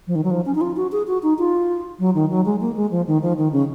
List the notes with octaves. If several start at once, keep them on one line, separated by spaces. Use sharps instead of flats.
F3
D#3
F#3
F3
C#4
D#4
F4
F#4
G#4
F#4
D#4
F4
F#3
D#3
F#3
G#3
A#3
G#3
F3
D#3
F3
D#3
C#3